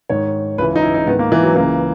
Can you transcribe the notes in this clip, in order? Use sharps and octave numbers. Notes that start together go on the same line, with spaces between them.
G#2 D#3 C#5
C#2 C#3 E3 B4
D#4
E4
D#4
G#2 D#3 B3
A#3
E3
F#3
C#2 C#3 E3 A#3